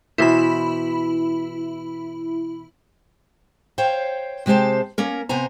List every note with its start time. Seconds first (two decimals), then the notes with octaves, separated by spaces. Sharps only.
0.18 B2 E3 E4 C5 B5
3.78 C5 C#5 F5 G5
4.46 C3 G#3 G4 C5 A5
4.98 A#3 C#4 A#4
5.29 C3 B3 C5 G#5 A#5